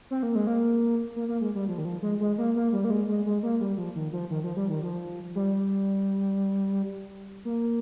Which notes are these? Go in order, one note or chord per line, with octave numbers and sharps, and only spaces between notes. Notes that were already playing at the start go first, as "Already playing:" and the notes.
C4
A#3
G#3
A#3
A#3
A#3
G#3
G3
F3
D#3
F3
G#3
G#3
A#3
A#3
G3
A#3
G#3
G#3
G#3
A#3
G3
F3
D#3
F3
D#3
F3
G3
D#3
F3
G3
A#3